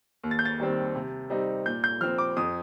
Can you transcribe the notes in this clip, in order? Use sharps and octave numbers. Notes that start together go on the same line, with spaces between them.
D#2
A6
G6
A6
D#3 G3 C4
C3
G3 C4 D#4
A#2 G6
G6
F3 C4 F6
D6
F2 D#6